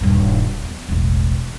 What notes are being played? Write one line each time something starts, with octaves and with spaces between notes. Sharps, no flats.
D#1 G2
E2
E1 A1